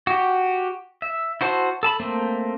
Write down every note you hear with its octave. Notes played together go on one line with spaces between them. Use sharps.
F#4 G4
E5
E4 F#4 C5 A5
A4 A5 B5
A3 A#3 C4